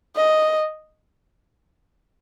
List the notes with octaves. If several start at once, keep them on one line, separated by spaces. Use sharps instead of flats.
D#5